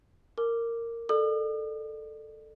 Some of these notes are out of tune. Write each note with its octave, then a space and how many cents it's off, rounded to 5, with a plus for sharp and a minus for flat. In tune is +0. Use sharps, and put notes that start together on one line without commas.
A#4 -15 D6 +0
A4 +0 D5 +35 D#6 -45